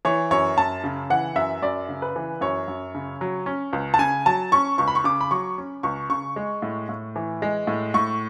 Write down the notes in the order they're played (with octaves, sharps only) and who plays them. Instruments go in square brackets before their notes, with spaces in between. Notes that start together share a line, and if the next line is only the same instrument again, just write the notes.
[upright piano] E3 C#5
F#2 C#5
F#2 A5
C#3
E3 F#5
F#2 E5
F#2 D5
C#3
B4
E3
F#2 C#5
F#2
C#3
F#3
C#4
C#2
A5
C#3 G#5
F#3 A5
C#4 C#6
C#2 C#6
B5
C#6
C#3 D6
B5
F#3 C#6
C#4
C#2 C#6
C#3 C#6
G#3
A2
A2
E3
G#3
A2
A2 C#6